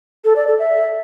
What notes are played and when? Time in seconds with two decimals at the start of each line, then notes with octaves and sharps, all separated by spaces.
0.24 A4
0.36 D5
0.47 A4
0.59 E5